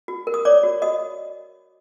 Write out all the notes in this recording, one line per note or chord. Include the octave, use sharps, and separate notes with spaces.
F#4
A#4
D#6
C#5 D5 D6
F#4
F#4 D#5 D#6